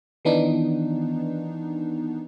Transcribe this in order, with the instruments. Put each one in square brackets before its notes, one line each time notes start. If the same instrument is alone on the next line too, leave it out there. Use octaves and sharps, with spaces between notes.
[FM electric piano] D#3 E3 B3 D4 D#4